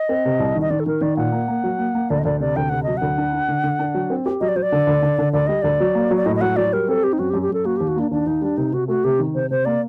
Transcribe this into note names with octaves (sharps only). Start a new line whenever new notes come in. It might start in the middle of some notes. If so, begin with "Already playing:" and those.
Already playing: D#5
C4
C3
C2
D#3
D#5
D#3 D5
A4
D#3 A#4
D#3 D5
A#2 F#5
A#3
A#3
F#3
A#3
A#3
D2 D5
D#5
D2 D5
C3 D5
D2 G5
C3 F#5
F#3 D#5
D2 F#5
D4
D4
D3
D3
D4
F#3
C4
G4
F#3 D#5
D5
F#3 C5
D5
D3
D2
D3
D3
D2 D5
G3 D#5
D2 D5
F#3
A#3
F#3
D5
A2 D#5
D#5
F#3 F#5
F#3 D5
G3 A#4
C4 A4
C4 G4
D#4
F#2 F#4
G4
F#2
G4
F#2 A4
A#3 F#4
D#2 G4
F#4
A#3 D4
D#2 D4
D#2 D#4
G3 D4
C3 D#4
C3 F#4
A3 F#4
C3 G4
D#3
C3 C5
C3 C5
A#3 D5